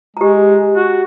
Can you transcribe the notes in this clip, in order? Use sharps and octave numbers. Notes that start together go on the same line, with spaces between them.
G#3 G4 A#5
F#4